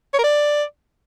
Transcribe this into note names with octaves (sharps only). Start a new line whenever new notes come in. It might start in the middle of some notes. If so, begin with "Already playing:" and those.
C#5
A#4
D5